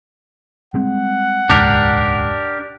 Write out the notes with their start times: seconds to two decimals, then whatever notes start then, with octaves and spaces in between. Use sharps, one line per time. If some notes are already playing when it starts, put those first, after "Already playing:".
0.74 G3 G#3 C4 F#5
1.50 D#1 C#2 G#2 D4 G4 A#4